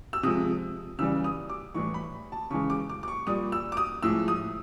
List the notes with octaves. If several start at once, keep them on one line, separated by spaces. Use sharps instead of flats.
E6
C3 F3 G#3 D#6
C#3 E3 G3 E6
D#6
D6
A2 E3 G3 C#6
B5
A5
C#3 E3 G#3 C#6
D6
D6
D6
C#6
A#2 G3 D#6
E6
D6
D#6
A2 F3 G#3 E6
D#6